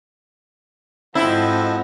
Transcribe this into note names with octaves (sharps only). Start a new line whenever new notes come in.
G#2 F3 C4 E4 F#4 A4 D#5